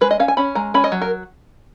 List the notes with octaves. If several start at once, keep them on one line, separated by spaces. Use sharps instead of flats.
G#3 B4
D#5
C#4 F5
G#5
C#4 B5
G#3 A#5
C#4 B5
D#5
F#3
A#4